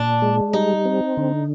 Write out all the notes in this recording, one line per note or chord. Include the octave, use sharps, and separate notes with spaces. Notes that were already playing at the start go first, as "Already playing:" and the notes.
Already playing: A#2 D4
G#3
G3 D#4
C4
D3